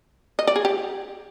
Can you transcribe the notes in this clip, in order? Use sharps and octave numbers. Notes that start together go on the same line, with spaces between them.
D#5
D5
G#4
G4